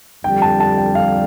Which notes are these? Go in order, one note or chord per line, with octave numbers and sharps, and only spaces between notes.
F2 D3 G3 G5
A5
A5
G5
F5